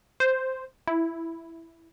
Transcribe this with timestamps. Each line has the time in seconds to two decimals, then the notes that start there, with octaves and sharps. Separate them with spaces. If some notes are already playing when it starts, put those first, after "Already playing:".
0.20 C5
0.88 E4